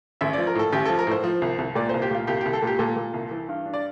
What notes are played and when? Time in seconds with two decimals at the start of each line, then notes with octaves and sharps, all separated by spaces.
0.21 A1 E5
0.33 F3 D5
0.47 A#4
0.55 A2 A4
0.73 A1 G4
0.85 F3 A4
0.99 A#4
1.07 A2 C5
1.24 F3
1.42 C2
1.58 C2
1.75 A#2 D5
1.89 C2 C5
2.02 G4
2.11 A#2 F4
2.27 C2 G4
2.41 C2 G4
2.53 A4
2.62 A#2 G4
2.79 A#2 A4
2.96 A#2
3.14 C2
3.31 E3
3.49 G2
3.66 D4
3.74 D5